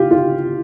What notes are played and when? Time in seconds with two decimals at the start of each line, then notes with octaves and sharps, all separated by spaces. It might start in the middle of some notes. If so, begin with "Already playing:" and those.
Already playing: F4 G4
0.11 F4